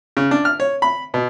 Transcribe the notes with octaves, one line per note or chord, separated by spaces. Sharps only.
C#3
D4
F6
C#5
B5
B2